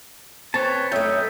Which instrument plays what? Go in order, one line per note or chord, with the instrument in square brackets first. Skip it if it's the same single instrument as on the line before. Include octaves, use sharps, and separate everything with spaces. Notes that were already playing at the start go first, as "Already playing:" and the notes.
[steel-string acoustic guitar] C4 [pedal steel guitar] B4 C#5 A5
[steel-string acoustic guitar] F#2 A3 [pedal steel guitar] D#5 E5 G5